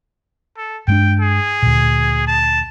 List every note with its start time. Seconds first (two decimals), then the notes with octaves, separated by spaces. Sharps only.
0.57 A4
0.88 G2 G#3 D4 G5
1.20 G#4
1.62 D2 A#2
2.28 A5